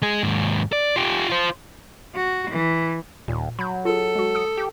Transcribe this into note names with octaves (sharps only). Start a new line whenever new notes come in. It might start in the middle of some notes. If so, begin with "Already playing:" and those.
G#3 G#4
D#2 G#2
D5
F4 G4
F4 C5
F#4
E3
D#2 A#2
F#3 B5 G6
F4 G#4 A4
G#3 F#4
D#6 E6 C#7
G4